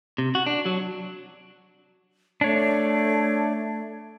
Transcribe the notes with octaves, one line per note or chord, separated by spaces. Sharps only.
C3
F#4
D4
F#3
A3 D4 C#5